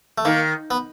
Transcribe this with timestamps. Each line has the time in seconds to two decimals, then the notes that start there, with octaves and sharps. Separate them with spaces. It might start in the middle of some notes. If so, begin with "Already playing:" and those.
0.18 A3
0.25 D#3 A#3
0.71 B3